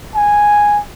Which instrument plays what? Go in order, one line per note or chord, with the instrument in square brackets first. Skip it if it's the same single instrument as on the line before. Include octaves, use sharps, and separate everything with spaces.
[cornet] G#5